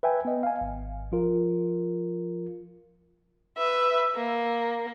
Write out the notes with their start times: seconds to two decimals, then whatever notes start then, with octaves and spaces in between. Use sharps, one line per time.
0.03 B4 E5 G5 G#5
0.25 B3 D#5
0.43 F5 G#5
0.61 G#1
1.12 F3 F4 A#4
3.57 B4 E5
4.16 A#3